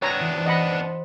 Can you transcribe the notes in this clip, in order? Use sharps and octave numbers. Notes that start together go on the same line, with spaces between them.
B3 D4 C#5 A5 A#5 E6 F#6
E3 C#7
F#4 C5
D#5 F#5 B5
C5